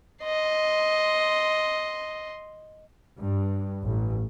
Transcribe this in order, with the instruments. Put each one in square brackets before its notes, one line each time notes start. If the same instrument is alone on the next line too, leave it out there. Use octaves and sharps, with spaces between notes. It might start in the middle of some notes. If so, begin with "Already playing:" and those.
[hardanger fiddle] D#5 C6
[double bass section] G2
A1